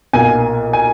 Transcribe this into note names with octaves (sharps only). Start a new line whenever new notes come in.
B1 A#2 A#3 G#5
G#5